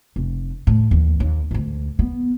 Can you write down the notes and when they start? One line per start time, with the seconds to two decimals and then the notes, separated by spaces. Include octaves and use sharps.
0.16 F1
0.67 A2
0.91 D#2 E3
1.20 D#2
1.51 D2 G#2
1.99 B3